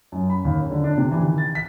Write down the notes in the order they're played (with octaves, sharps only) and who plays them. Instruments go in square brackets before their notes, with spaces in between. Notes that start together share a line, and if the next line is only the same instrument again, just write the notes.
[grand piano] F#2
B5
D#2
C#4
D3
D4
C3
E3
D#3
A6
B6